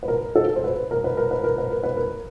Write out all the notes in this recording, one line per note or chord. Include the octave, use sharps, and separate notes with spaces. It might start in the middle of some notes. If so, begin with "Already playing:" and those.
B4
A#4
A4
C5
B4
A#4
B4
A#4
B4
A#4
B4
A#4
B4
A#4